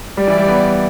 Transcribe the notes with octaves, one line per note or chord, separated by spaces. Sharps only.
G3 D5
E3
G3
B3